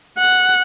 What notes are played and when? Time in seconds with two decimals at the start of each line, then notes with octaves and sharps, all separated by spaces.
0.18 F#5